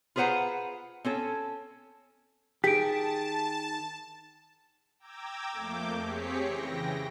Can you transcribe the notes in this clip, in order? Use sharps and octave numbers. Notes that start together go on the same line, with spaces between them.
F4 G#4 B4 C5 F#5 A#5
C4 C#4 A4
D#3 G4 G#4 A5 B6 D7
G5 A#5 D6 E6 G#6
F2 A3 A#3 D6 G6
C4 G4 G#4 C#5 B6 C#7
C#3 E3 G5 A#6